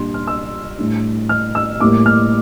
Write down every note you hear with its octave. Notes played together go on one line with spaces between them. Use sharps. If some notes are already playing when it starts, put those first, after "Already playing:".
Already playing: A#2 G3 D4 C6
F6
E6
A2 G3 D4
F6
E6
A2 G3 A#3 D6
F6